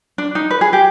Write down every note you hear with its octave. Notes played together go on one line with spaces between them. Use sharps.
D4
D#4
B4
G#4
G4